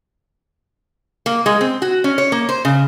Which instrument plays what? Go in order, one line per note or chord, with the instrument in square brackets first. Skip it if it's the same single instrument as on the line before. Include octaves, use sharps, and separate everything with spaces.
[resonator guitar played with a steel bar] A#3
G#3
C4
F#4
C#4
C#5
A#3
C5
C#3